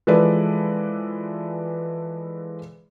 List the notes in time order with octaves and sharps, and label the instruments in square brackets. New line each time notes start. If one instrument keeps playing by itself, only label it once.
[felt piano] E3 F3 G#3 A4 B4 D5